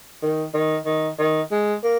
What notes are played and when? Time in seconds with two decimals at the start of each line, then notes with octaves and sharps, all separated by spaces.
0.22 D#3
0.54 D#3
0.86 D#3
1.19 D#3
1.52 G#3
1.84 A#3